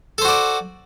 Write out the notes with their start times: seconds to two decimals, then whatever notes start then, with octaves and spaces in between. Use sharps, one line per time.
0.18 A4
0.22 C5
0.25 F#4
0.28 D5